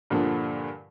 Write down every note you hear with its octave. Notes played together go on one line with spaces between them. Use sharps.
G2 A#2 D3 F3